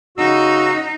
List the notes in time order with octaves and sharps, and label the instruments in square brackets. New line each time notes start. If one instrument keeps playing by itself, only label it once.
[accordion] C#3 F#4 E6 [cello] D#4